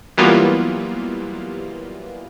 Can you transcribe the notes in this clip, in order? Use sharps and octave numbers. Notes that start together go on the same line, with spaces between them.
E3 F#3 G3 A#3 B3 F4